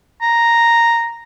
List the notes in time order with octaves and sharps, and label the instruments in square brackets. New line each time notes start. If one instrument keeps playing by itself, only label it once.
[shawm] A#5